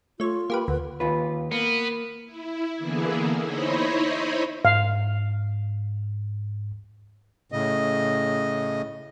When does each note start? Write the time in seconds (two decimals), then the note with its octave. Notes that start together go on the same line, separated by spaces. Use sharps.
0.20 A3 F4 C#5
0.50 A#3 G4 B4
0.68 D2 B4
1.00 D#2 F4 B4
1.52 A#3 B3
2.25 E4
2.77 D3 E3 A#3 B3 E4 G#4
3.42 D#4 E4 C5 C#5 D#5 B5
4.65 G#2 F5
7.52 A2 C#3 D#5